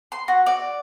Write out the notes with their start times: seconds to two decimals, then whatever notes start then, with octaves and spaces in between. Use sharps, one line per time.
0.12 C6
0.28 F#4
0.46 D5